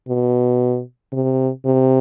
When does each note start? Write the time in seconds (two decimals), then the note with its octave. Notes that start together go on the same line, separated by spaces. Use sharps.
0.09 B2
1.13 C3
1.65 C3